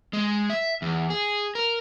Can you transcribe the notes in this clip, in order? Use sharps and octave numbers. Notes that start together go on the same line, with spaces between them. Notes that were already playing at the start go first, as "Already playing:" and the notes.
G#3
E5
E2
G#4
A#4